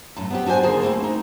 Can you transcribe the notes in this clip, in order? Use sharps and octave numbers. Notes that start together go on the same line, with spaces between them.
F#2 A2
B3 C4 G4
D4 F#4 G#4 C5 G#5
D#2 D3 A#3 G#4 C5 A5
A3 A#3 C4 E4
D#4